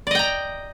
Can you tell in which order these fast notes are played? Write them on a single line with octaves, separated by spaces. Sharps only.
D5 D#5 G5 A#5